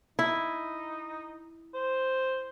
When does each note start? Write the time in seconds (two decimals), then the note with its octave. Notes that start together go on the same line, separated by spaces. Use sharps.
0.19 D#4 E4
1.74 C5